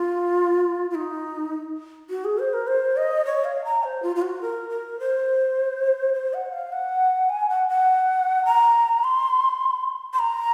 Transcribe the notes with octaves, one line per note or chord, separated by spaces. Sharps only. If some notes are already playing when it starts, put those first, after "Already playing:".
Already playing: F4
F4
D#4
F#4
G#4
C5
A#4
C5
D#5
C#5
F5
A#5
C5
F4
F4
F#4
A#4
A#4
C5
C5
F#5
F5
F#5
G#5
F#5
F#5
A#5
C6
C6
A#5